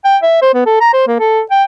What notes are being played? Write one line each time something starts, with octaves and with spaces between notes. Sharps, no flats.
G5
E5
C5
B3
A4
A#5
C5
A#3
A4
G5